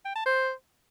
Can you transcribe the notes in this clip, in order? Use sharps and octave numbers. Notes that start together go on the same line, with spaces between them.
G5
A5
C5